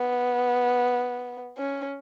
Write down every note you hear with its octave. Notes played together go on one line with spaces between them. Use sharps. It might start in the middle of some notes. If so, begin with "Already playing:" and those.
Already playing: B3
C#4